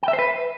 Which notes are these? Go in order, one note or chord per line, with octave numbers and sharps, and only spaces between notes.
G5
E5
C5
B4